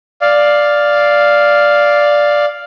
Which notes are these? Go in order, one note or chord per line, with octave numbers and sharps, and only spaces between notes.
D5 F5